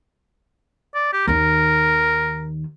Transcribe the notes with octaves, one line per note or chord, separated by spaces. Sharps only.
D5
G4
D#2 D#3 A#4